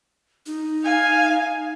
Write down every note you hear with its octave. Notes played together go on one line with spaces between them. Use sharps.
D#4
F5 G#5